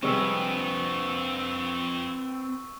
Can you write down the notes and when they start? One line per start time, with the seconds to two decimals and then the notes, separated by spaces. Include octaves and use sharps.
0.03 F2 C3 G3 G#3 C4 B4 C#6 E6